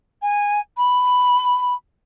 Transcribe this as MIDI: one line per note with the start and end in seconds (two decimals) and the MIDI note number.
0.22 0.59 80
0.77 1.74 83